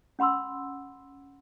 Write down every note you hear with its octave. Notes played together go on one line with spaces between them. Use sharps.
C#4 F#5 B5 C6 E6